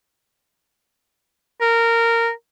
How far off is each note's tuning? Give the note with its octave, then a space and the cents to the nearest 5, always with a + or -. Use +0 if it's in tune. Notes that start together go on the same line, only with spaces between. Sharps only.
A#4 -15